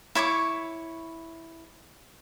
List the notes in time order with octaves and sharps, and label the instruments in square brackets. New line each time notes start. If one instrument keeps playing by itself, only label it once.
[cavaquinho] E4 C#5 C#6 D6